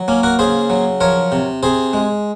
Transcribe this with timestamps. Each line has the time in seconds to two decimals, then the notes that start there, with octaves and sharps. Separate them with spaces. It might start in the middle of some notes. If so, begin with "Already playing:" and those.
Already playing: F#3
0.08 A#3 C#4
0.23 F#4 A#4
0.39 C#3 G#4 C5
0.70 F#3
1.01 F3 A#4 C#5
1.32 C3
1.63 C3 G#4 C5
1.93 G#3